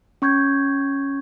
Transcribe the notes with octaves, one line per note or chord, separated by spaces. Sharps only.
C#4 C#6 G6 G#6